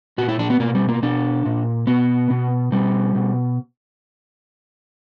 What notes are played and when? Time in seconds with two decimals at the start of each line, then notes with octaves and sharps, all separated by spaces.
0.18 A#2 F#4
0.28 E4
0.39 D4
0.50 B3
0.60 B2 A#3
0.75 G3
0.89 A#3
1.03 B2 D4
1.46 A#2
1.87 B2 B3
2.30 B2
2.72 B2 G3
3.15 B2